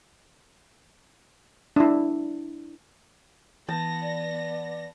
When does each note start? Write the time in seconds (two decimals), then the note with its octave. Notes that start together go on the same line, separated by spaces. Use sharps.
1.76 D4 E4
3.69 E3 B3 A5 A#6
4.02 D5